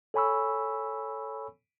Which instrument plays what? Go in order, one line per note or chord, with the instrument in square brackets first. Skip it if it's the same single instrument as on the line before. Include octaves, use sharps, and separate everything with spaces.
[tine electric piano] A4 C#5 G#5 B5 C#6 E6